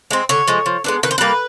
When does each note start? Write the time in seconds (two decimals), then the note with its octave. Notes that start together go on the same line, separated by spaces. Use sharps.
0.11 G#3 C4
0.29 D3 C#5
0.48 F3 G#3
0.66 F3
0.84 G#3 B3 D4
1.03 D#3 B4
1.11 C5
1.18 G3 A#3 C#4 B4